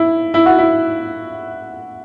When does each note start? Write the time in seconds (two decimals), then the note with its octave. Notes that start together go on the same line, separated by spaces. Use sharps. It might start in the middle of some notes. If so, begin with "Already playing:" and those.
Already playing: E4
0.34 E4
0.46 F#4
0.58 E4